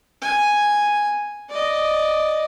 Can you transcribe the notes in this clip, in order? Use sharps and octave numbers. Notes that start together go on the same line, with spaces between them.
G#5
D5 D#5